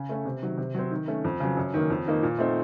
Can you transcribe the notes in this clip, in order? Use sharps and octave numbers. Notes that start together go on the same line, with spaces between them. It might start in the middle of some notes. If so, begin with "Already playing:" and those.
Already playing: C#3
A3 C#4
C3
D#3 F#3
C3
F#3 C4
D#3
A3 C#4
F2
C#3 F#3
F#2
D#3 A#3
F2
D#3 A#3 D#4
A#2
A3 C4 D#4